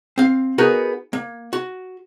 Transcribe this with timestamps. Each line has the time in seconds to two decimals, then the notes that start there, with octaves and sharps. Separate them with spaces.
0.18 C4 F5
0.58 B3 D#4 F#4 G#4 A#4 A#5
1.13 A#3
1.53 F#4